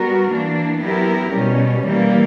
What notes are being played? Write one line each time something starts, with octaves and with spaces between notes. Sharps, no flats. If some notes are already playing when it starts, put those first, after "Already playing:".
Already playing: G3 B3 F#4 A#4
E3 A#3 D4
F#3 B3 E4 G4 A#4
B2 G3 C#4
E3 G3 A#3